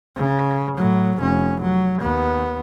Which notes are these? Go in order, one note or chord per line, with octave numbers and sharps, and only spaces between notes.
C#3
A2 F#3
F1 C#4
F#3
D#2 B3